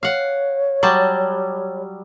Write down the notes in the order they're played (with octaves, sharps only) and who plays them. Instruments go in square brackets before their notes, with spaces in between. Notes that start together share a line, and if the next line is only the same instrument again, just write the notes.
[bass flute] C#5 [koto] F5 F#5
[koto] F#3 G3 A5